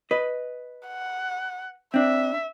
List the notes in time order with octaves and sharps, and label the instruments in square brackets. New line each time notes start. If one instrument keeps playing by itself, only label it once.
[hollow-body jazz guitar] B4 D#5
[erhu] F#5
[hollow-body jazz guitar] C4 D4 [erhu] E5